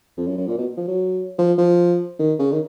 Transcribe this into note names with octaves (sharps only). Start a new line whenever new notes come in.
F2
F#2
F#2
A#2
B2
F3
F#3
F3
F3
D#3
C#3
D#3